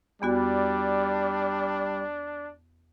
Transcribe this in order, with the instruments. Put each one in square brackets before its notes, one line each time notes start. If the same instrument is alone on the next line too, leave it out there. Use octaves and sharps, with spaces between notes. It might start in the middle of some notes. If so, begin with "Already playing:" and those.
[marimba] E2 B3 F#4 [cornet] G3 [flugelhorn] D4